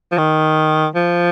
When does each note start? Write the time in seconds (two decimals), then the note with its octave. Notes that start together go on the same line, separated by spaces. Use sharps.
0.11 F3
0.18 D#3
0.95 F3